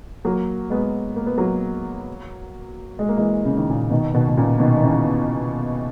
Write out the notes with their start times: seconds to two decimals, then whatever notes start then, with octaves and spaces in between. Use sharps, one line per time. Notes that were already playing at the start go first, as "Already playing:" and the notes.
0.25 F#3 A#3
0.70 G#3 B3
1.16 A#3
1.27 B3
1.37 F#3 A#3
2.99 G#3
3.09 A#3
3.17 E3 G#3
3.45 C#3
3.57 D#3
3.69 A#2 C#3
3.90 B2 D#3
4.14 B2 D#3
4.29 B2
4.37 A#2 C#3
4.60 B2 D#3
4.77 D#3
4.82 C#3 E3